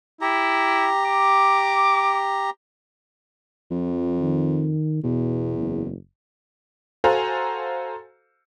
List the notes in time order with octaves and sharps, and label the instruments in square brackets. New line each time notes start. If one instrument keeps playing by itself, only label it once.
[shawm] E4 [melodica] G4 A#5
[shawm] D6
[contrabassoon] F2 [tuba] F3
[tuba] D#3
[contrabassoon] E2 [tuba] B2
[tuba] F#1
[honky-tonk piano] F#4 A4 C5 F5 G#5 A#5